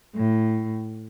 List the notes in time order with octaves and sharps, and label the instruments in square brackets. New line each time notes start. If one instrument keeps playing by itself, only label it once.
[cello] A2